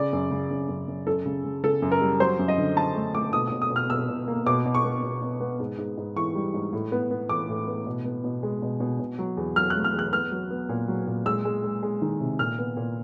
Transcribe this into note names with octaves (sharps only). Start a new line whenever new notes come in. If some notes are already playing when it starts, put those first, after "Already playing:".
Already playing: C#3 D5
F#2
C#3
F#2
F#2
F#2
F#2 A4
C#3
C#3
C#3 A4
F#2
A#4
G3
F#3 C5
F#2
D#5
D3
D3 A5
A3
A3 D6
B2 D#6
D#6
B2
D#6
B2
F6
B2 E6
B2
A#3
B2 D6
B2
C#6
B3
B2
B2
B3
G#2
G#2
G#2
E3 C#6
G3
G#2
A2
B3
B3
E3 D6
A2
B3
B2
B3
B2
G#3
B2
B2
B2
F#3
E2
F#3 F6
F#6
A3
F6
E2
F#6
B3 F6
F#3
B3
A#2
F#3
A#2
G#3 E6
G#3
G#3
G#3
D#3
C3
A#2 F6
B3
A#2